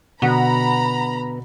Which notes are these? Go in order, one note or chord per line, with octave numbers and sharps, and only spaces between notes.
B2 D3 B3 F#4 A#5 B5